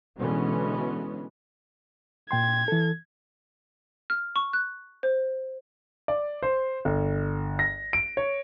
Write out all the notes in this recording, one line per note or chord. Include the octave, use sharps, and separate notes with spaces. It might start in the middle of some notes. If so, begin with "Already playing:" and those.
B2 D3 E3 G#3 B3 C#4
A#2 G5 C6 G#6
E3 A4
F6
C#6
F#6
C5
D5
C5
G1
A#6
D7
C#5